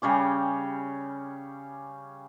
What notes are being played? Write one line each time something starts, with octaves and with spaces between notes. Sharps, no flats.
C#3 G3 C#4 G4